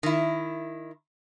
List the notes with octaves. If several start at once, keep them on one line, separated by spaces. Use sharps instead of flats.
D#3 E4